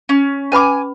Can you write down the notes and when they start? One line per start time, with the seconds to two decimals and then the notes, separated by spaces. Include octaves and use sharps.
0.09 C#4
0.52 C#4 B4 G#5 B5 D6